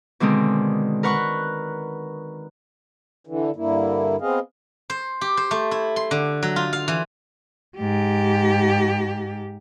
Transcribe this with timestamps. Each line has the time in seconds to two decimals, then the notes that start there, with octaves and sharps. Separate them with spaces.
0.20 B2 D3 D#3 G#3 C4
1.03 A#4 B4 F#5 C#6
3.27 D3 E3
3.56 G2 D3 A#3 E4
4.21 B3 C4 G#4 D#5 F5
4.90 C5
5.21 G4
5.37 C5
5.51 A3
5.71 E4
5.96 C6
6.11 D3
6.43 F#3
6.56 F4
6.73 F5
6.88 E3
7.78 G#2 G4